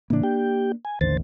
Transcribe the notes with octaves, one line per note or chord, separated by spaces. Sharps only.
A2 C#3 E3 A#3 D4
G4 G5
G#5
A1 D#2 D3 C5 A6